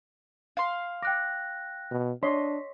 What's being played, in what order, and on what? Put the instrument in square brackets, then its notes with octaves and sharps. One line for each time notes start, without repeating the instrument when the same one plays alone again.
[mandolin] F5 C6
[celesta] G5 F#6 A#6 [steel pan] D6
[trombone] B2
[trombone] D4 [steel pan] C#5 D#5 C6 [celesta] B6